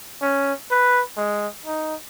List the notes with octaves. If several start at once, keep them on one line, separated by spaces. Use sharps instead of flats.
C#4
B4
G#3
D#4